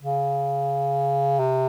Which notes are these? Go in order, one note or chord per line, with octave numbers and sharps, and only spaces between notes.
C#3
C3